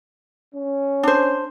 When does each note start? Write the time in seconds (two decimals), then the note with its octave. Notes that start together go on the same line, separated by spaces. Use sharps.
0.54 C#4
1.03 D4 C5